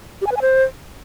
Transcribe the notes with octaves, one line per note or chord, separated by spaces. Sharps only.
G4
G#5
B4
G#5
C5